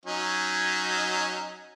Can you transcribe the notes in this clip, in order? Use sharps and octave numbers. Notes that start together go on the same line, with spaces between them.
F#3 C#4 D#4